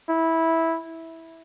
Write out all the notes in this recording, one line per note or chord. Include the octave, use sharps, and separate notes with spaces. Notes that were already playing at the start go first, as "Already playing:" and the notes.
E4